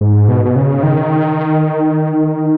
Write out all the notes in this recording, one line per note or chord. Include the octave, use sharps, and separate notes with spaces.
G#2
B2
B2
C#3
D#3